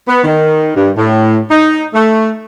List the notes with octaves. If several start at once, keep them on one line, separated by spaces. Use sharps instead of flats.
B3
D#3
G2
A2
D#4
A3